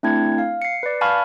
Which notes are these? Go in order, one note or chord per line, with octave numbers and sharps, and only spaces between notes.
A3 C4 D4 E4 G#6
F5
C7 C#7
B4 D5
F5 G#5 A5 B5 C#6 F6